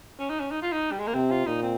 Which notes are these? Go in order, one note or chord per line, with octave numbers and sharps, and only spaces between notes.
C#4
D#4
C#4
D#4
F4
D#4
G3
G#3
A#3
C3 C4
F4
A#2 D#4
C4